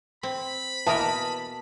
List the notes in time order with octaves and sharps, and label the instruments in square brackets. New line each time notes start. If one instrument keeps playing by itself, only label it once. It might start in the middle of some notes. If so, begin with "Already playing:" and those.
[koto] C4 [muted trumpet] B5
[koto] B2 A#3 A#4 [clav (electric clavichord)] E3 [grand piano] A5 D#6